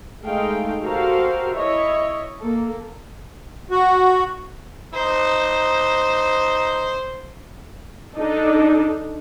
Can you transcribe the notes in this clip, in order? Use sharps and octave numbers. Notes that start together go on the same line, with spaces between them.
G#3 A3 D#4 G#4 F5 G5
F#4 G4 A4 A#4 C5 F5
E4 C#5 D#5 E5
A#3 A4
F#4
D#4 C5
D4 D#4 A4